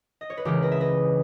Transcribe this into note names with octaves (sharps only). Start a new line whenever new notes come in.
D#5
C#5
B4
C#2 C#3 E3 G4 A#4
B4 D#5
E5
B4 D#5